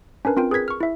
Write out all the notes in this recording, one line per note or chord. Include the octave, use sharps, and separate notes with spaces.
C#4 D4 A#4 B4
C4 F4 A#4 G5
G#4 A#4 B4 G#6 B6
C#6 F6
E4 E5